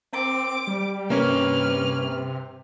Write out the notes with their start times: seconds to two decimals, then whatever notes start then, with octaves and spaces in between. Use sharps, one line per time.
0.13 C4 D6
0.67 G3
1.10 G2 C3 A#3 C#4 B4 F6